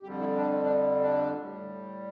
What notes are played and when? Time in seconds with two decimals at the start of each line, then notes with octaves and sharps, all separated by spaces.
0.03 F2 D3 G3 G4
0.20 E4
0.36 D4
0.49 C4
0.63 D4
1.01 D4
1.35 A2 G3